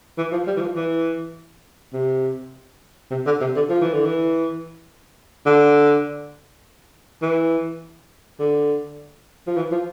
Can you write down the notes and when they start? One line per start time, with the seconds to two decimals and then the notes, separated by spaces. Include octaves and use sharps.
0.18 E3
0.32 F3
0.47 G3
0.57 E3
0.61 F3
0.76 E3
1.93 C3
3.11 C3
3.26 D3
3.40 C3
3.56 D3
3.69 F3
3.82 E3
3.93 D3
4.05 E3
5.46 D3
7.22 E3
8.40 D3
9.47 F3
9.57 E3
9.72 F3